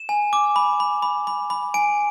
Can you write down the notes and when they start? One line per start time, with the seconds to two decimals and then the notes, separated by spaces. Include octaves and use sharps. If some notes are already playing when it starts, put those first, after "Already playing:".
Already playing: E7
0.09 G#5
0.33 D6
0.56 B5
0.80 B5
1.02 B5
1.27 B5
1.50 B5
1.74 G#5 D7